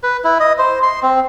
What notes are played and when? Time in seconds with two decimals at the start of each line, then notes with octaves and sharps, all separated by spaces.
0.03 B4
0.24 E4
0.40 D#5
0.58 C5
0.83 C6
1.03 C4